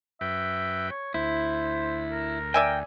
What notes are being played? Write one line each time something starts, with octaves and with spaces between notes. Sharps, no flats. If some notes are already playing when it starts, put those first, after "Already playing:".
F#2 B4 E5 G5
C#5
D2 E4 C5
A#4
D5 E5 G5 G#5